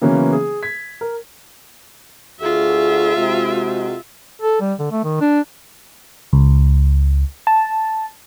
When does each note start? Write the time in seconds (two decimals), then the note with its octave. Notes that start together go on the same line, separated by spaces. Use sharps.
0.02 C#3 E3 F#3 A#3 B3 C#4
0.33 G#4
0.63 G#6 B6
1.01 A#4
2.41 D2 F4 F#4 G#4 E5
3.17 C3 G#3 F#4
4.42 A4
4.61 G3
4.79 D3
4.92 A3
5.04 D#3
5.21 D4
6.33 C#2
7.47 A5